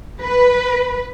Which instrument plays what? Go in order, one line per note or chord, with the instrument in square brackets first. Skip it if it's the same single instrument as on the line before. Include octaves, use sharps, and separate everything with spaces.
[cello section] B4